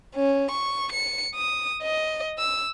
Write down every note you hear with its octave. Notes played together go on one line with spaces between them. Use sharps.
C#4
C#6
C#7
D#6
D#5
E6